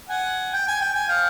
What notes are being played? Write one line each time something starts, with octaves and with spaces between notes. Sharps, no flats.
F#5 G#5
G5
G#5
G5
G#5
F5 G5